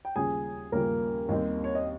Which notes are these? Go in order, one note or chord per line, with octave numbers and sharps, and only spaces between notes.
G5
D#2 C#3 G3 C#4 F4 G#4 G#5
D#2 C#3 G3 A#3 C#4 F4 A#4
D#2 D#3 G3 C4 D#4
C#5
D#5